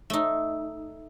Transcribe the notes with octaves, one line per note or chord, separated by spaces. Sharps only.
A3 D#4